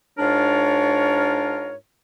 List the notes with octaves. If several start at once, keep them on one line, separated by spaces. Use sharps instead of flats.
G#2 D4 F4 A#4 C#5